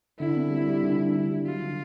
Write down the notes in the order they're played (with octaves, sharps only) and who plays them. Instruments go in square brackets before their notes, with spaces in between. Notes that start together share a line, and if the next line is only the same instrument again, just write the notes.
[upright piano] D3 [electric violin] E4
[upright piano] C4
G3
G3
D3
D3
D3
G3
[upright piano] F#3 [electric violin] F4
[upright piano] D3